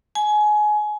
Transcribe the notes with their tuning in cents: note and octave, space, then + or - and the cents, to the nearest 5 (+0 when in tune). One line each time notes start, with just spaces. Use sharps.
G#5 +25